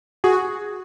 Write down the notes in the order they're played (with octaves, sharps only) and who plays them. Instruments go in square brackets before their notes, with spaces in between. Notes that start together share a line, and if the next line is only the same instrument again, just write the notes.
[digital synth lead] F#4 [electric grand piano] G#4